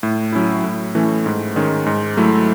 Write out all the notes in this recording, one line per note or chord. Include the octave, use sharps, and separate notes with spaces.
A2
F#3 C#4 E4
A2
E3 A3 C#4
G#2
D#3 G#3 C#4
G#2
F#3 A3 E4